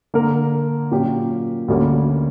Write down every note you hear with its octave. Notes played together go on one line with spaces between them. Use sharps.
D3 A#3 D4 A#4
A#2 F#3 C#4 G4
D2 D3 G3 A#3 C#4